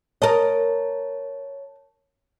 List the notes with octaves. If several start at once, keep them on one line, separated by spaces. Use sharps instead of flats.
A#4 C#5 D#5 A5